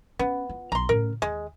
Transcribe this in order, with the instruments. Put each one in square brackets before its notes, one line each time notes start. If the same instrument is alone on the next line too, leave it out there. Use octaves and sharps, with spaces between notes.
[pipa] B3 [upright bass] C#4
[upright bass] F4
[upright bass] B1 F#3 [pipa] A#5 C6
[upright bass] A2 C#3 [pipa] A#4
[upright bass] D#2 [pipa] G#3